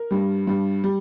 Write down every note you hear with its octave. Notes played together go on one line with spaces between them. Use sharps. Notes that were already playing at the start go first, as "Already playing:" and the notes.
Already playing: A#4
G2 G3
G2 G3
G3